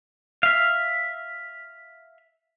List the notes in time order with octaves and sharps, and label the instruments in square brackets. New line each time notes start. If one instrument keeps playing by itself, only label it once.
[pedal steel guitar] E5 F5